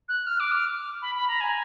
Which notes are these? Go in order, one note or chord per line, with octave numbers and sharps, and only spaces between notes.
F#6
F6
D6
F6
B5
B5
A#5
G#5